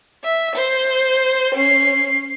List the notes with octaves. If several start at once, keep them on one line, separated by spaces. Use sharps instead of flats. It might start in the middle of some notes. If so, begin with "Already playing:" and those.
E5
C5
C#4 C7